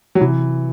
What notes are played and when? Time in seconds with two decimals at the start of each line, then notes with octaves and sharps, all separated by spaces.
0.15 F#3
0.21 C3 E3